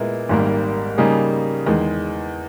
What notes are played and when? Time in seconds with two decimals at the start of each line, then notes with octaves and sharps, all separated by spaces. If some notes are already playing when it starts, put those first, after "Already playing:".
Already playing: A#2 G#3 B3 E4 A#4
0.29 G#1 G#2 G3 A#3
0.98 C#3 G3 A#3 D#4 G#4
1.66 E2 D#3 G#3